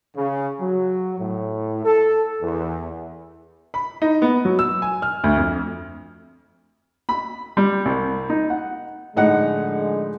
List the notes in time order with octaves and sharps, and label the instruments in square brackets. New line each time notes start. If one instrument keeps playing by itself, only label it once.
[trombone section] C#3
F#3
A2
A4
E2
[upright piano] B5
D#4
B3
F#3
E6
G#5
F6
D2
F2
[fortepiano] B5
G3
C2
D#4
F#5
[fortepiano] A2 D#4 F#5 [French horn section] D3 F3 G#3